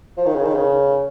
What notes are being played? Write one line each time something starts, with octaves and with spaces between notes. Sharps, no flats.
F3
D#3
C#3
D#3
C#3